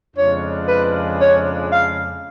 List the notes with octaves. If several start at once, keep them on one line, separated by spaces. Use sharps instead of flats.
F2 C#3 G#3 D4 F4 C#5
B4
C#5
F5